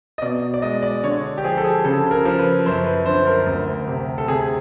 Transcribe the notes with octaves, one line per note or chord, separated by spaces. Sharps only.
D#5
B2 D5
D5
G#3 D#5
D5
D3 C#5
G4
F3 G#4
A4
G#4
C#3 A4
A#4
F3
B4
F#2 C5
B4
D3 C5
A#4
D2
C3
A4
C3 G#4